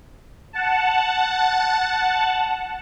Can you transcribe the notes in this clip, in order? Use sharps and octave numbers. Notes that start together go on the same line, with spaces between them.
F#5 A5